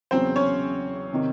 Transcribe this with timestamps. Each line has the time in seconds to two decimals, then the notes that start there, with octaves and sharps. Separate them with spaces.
0.11 E2 C#3 F#3 C4 C5
0.36 C#4 C#5
1.13 C3 D#3